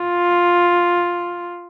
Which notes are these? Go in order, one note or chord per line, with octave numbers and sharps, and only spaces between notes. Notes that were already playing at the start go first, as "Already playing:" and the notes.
Already playing: F4